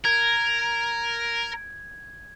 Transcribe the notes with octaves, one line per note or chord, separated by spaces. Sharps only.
A#4 G#6